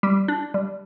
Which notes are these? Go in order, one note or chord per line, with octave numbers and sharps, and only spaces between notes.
G3
D4
G3